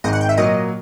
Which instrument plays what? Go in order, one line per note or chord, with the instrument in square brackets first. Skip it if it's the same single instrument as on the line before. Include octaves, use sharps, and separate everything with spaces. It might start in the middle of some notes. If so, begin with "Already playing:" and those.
[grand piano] G#1 G#2 D#3 [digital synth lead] D#5
[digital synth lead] F#5
G5
E5
[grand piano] A#2 F#3 A#3 [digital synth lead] D#5